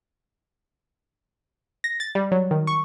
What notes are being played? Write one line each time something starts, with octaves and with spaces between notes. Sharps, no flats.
A#6
A6
G3
F#3
D#3
C#6